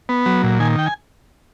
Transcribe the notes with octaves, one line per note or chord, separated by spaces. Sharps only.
B3
F#3
A#2
D#3 G#5
G5
G#5